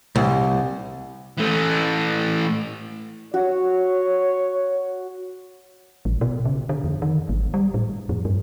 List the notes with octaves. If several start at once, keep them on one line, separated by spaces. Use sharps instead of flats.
C2
E3 A3
F#4 C#5
A1
B2
C#3
D3
F2
D#3
G#1
G3
A2
F2
G2